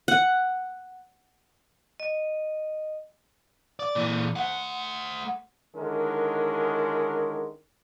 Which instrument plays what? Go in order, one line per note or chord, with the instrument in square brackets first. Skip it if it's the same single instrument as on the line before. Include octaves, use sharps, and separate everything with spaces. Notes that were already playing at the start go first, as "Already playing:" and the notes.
[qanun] F#5
[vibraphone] D#5
[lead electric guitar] D5
A#2 E3
A3 F#5
[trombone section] D3 D#3 G#3 C#4 E4 A#4